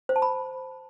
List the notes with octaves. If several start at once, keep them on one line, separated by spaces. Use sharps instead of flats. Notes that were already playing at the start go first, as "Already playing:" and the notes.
C5
A5
B5